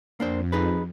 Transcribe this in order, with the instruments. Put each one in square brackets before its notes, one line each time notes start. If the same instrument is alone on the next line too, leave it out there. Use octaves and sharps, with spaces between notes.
[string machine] F2 [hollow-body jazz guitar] A#3 D4 C5
[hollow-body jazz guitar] D#4 G#4 B4